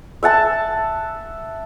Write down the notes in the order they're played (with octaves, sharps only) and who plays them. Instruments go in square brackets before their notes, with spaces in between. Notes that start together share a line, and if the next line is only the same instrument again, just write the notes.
[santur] E5 F#5 A5 E6